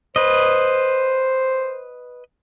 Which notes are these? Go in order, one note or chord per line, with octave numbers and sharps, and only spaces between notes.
B4 C5 D#5